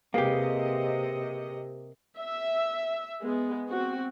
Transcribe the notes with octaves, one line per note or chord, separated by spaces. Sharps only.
C3 A#3 G4 G#4 B4 D#5 F5
E5
G#3 B3
C4 F#4